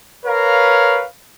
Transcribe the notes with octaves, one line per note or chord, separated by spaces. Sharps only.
A#4 B4 C#5 F5